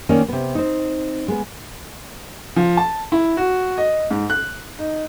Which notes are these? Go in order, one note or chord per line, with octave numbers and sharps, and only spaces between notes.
D#3 A#3 C#4 D5
C3 B3
C4 D#4
G#3 B3
F3
A5
E4
F#4
D#5
G#2
F#6
D#4